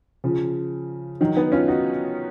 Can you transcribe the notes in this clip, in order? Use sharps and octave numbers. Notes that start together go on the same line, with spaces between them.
C#3 F3
D#3 F#3
B3 D#4
C#4 F4
D#4 F#4